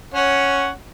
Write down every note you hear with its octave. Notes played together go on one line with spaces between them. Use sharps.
C#4 C#5 F#5